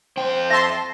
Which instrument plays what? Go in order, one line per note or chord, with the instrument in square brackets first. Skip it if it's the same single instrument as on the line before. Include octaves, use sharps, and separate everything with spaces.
[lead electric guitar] F2 G5 [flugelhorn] C5
[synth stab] E5 A5 C6 [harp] A#6